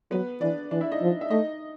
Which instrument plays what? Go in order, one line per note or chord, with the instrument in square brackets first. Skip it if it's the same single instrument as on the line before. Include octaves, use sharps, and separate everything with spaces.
[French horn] F#3 [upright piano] B3 B4
[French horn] E3 [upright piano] D4 D5
[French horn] E3 [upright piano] D4 D5
[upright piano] E4 E5
D#4 D#5
[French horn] F3
[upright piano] E5
[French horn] A3 [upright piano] D#4 D#5